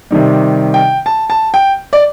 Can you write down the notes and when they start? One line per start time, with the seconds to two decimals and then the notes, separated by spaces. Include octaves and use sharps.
0.11 C3 D#3 G3
0.74 G5
1.06 A5
1.30 A5
1.54 G5
1.93 D5